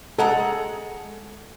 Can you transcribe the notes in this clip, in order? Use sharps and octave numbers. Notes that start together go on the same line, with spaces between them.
G#3 A4 F#5 A#5